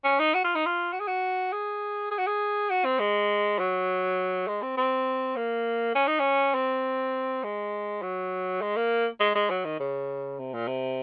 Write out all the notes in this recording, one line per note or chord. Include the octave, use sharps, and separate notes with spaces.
C#4
D#4
F#4
F4
D#4
F4
F#4
G#4
F#4
G#4
G#4
F#4
G#4
F#4
C4
G#3
F#3
G#3
C4
C4
A#3
C#4
D#4
C#4
C4
G#3
F#3
G#3
A#3
G#3
G#3
F#3
D#3
C#3
C3
A#2
C3